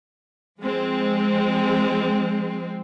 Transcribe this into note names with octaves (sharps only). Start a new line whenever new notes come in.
F3 G#3 C4